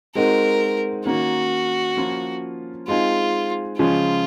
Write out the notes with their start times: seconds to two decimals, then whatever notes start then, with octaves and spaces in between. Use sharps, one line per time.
0.15 G#3 C4 D#4 F#4 A#4
1.06 D#3 A#3 C#4 F#4
1.97 F3 A#3 C#4 F4
2.88 G#3 C4 D#4 F4 G#4
3.79 C#3 F3 G#3 C#4 F4 G#4